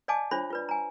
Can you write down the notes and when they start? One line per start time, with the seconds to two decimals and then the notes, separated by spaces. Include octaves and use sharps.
0.08 D5 D#5 F5 G#5 A5 D6
0.31 D4 F4 C5 C#5 E5 B5
0.50 F4 B4 D5
0.69 G#5 A#5